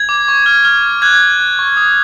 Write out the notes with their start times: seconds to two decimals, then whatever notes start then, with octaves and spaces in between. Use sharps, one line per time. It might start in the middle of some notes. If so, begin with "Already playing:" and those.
Already playing: G#6
0.09 D6
0.28 C#6
0.46 F6
0.65 F6
0.84 F6
1.02 F#6 G#6
1.21 F#6
1.40 F#6
1.59 C#6
1.77 D#6